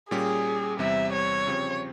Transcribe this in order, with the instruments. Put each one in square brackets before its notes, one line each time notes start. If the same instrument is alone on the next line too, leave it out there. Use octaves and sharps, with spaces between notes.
[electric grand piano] A#2 G3 C#4 G4 [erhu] G#4
[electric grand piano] E2 C3 G3 C4 [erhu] E5
[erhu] C#5
[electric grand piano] C#3 F3 C4 G4